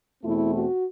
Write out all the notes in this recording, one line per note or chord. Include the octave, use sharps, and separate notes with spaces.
E2 B2 A3 C4 E4
F#4